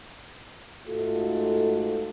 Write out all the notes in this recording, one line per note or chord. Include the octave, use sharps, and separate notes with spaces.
G#2 A3 F4 F#4 A4